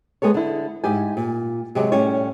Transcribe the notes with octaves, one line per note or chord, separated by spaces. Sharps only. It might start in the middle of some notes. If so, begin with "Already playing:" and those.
G#3 B3 A4 C#5
D3 E4
G#2 E4 G4 G#5
A#2
C3 F#3 G#3 F#4 G4
A2 G3 C#4 C#5